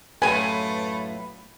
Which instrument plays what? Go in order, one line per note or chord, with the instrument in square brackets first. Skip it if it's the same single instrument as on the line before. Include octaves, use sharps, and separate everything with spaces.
[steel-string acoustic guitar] F#2 A2 F4 [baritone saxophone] A3 [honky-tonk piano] B4 [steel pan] G#5